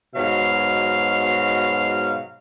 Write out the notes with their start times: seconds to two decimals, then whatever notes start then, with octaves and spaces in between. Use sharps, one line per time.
0.15 G#2 B2 F#3 F5